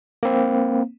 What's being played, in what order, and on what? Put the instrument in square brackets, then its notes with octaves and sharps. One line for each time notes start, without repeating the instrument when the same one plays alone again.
[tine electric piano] A#3 C4